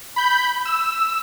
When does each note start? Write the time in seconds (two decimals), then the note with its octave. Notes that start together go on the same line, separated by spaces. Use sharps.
0.16 B5 G6
0.65 E6